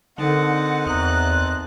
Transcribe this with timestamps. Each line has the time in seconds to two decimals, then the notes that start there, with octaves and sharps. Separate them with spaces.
0.18 D3 C4 D#4 A4 A#4 D#5 F#5 A5
0.86 E2 A#5 D#6 F#6